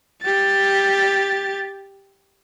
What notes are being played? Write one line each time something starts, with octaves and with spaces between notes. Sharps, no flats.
G4 A6